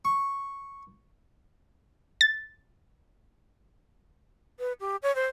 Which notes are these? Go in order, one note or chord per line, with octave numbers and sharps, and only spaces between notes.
C#6
A6
B4
G4
C#5
C5